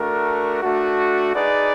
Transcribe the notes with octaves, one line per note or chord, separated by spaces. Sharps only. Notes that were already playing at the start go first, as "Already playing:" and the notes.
Already playing: A3 D4 F#4 A#4
A3 D4 F#4
D#4 G#4 B4 D5